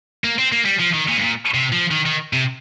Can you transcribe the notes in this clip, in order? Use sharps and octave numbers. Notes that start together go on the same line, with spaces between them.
A#3
C4
A#3
G3
F3
D#3
A#2
G2
A#2
C3
F3
D#3
D#3
C3